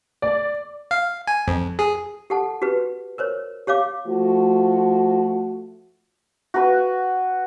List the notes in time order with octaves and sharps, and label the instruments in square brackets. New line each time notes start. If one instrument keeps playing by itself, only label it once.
[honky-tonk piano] D5
[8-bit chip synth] F5
G#5
F2
G#4
[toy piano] G4 A4 F#5 A5
F#4 G4 B4
A#4 C5 C#5
G4 C#5 F5 D6
[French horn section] F3 A3 F#4
[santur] F#4 B4